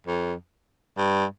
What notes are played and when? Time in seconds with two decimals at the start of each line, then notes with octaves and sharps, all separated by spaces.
0.07 F2
0.97 G2